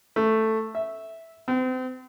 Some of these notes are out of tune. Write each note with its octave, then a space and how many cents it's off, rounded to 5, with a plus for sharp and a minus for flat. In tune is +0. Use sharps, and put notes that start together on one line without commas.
A3 +5
E5 -5
C4 -35